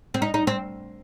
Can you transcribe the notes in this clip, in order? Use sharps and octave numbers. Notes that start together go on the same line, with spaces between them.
C4
D#4
D#4
C4